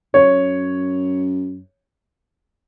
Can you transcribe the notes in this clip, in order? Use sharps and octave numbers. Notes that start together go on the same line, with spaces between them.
F#2 C#5